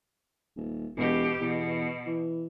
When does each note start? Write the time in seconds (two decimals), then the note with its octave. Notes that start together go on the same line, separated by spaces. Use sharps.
0.56 D#1
0.97 E1 B2 G4
1.40 E2 B2
2.06 E3